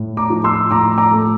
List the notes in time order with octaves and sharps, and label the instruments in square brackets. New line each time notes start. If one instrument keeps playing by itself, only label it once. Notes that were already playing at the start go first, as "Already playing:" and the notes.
Already playing: [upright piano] A2
A#5 D6
F3
C6 E6
A2 A#5 D6
A#5 D6
A3